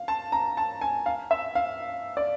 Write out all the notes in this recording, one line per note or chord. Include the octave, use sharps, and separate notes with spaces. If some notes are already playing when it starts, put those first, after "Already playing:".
Already playing: F5
A5
A#5
A5
G#5
F5
E5
F5
D5